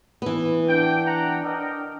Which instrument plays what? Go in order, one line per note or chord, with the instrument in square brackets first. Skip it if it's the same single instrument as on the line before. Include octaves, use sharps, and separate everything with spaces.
[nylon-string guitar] E3 B3
[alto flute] D4 [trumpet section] G5
[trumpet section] F#5 A#5
A#4 D#5 G5